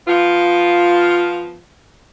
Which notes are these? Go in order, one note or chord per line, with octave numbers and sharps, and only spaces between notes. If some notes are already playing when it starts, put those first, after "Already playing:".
F3 B3 F4